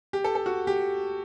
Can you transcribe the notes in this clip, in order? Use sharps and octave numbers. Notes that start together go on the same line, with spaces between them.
G4
A4
A4
F#4
G4